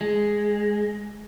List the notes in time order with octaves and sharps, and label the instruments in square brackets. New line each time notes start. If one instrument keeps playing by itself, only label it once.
[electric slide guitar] G#3